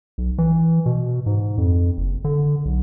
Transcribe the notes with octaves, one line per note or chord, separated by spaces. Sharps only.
B1
E3
B2
G#2
F2
F#1
D3
B1